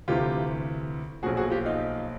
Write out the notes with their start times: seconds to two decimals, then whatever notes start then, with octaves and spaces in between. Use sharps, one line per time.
0.08 D2 C3 E3 F4 G4
1.23 B1 A#2 F3 F#4 G#4
1.37 F#4 G#4
1.50 F4 G4
1.65 D#4 F4